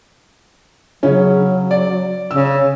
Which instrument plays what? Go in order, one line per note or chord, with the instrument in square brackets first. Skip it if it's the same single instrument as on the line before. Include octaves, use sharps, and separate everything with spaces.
[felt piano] C#3 C#4 [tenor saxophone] F#3
[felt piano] D5
[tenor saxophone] C#3 [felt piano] E6